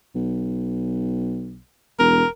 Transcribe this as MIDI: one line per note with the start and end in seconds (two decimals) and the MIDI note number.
0.15 1.60 35
1.99 2.22 28
1.99 2.27 70